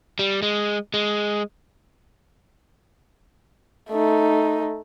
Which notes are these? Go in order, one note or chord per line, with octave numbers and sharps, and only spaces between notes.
G3
G#3
G#3
A3 D#4